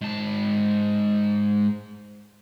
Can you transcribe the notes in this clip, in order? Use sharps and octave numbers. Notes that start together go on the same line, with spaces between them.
G#2 A5